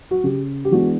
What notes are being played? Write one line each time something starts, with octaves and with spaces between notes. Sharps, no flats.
F#4
C#3 G4
G4
E3 G#3 B3 D4 F#4